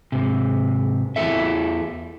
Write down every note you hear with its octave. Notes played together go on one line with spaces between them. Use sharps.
G#2 C3
E2 E3 F3 F4 A4 E5